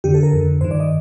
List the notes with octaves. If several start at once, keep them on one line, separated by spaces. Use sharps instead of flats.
F2 D3 G4
A4
A#4
F2 D3
G2 D#3 C5
D5
D#5